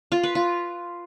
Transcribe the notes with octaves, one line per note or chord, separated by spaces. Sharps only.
F4
B4
F4